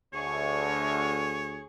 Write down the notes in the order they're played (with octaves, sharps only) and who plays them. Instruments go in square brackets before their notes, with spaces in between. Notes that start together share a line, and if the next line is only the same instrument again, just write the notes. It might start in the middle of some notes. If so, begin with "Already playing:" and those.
[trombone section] D2 [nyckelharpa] G#4 C#6 [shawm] C#5